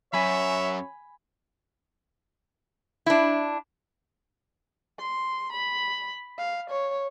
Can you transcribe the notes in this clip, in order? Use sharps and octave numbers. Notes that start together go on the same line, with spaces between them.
F#2 C#5 E5 G#5 B5
D4 E4
C6
B5
F5
C#5